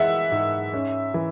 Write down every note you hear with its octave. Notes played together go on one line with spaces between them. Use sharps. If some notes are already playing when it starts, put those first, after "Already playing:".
Already playing: E3 G#3 E5 F#5
G#2
C#4
E3